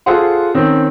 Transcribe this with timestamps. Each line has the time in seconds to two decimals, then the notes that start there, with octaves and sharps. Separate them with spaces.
0.06 F4 G#4 A4 C5 F#5 C6
0.55 D#3 C4 C#4